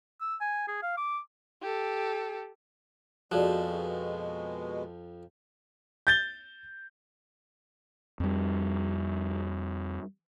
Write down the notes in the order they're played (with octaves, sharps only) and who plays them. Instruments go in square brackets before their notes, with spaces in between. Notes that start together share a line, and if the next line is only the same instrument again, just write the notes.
[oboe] E6
G#5
G#4
F5
D6
[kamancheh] G4 A4
[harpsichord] F2 F3 [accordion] B2 G#3 [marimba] F#4 G#4 D5
[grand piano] G6 A6 G7
[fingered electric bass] F2 G3